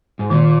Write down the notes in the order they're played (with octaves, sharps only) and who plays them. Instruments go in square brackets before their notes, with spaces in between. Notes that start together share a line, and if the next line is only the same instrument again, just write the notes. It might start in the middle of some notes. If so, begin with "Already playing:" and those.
[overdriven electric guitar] G#2
[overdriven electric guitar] A#2 [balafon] D#3